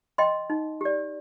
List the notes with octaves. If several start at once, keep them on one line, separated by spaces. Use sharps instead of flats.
D#5 G5 C6
D#4
G4 D5